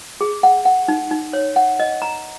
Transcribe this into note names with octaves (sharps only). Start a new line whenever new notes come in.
G#4
F#5
F#5
D#4
D#4
C#5
F#5
D#5
A#5